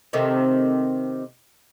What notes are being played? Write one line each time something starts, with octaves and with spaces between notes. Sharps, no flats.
C3 D#3 A3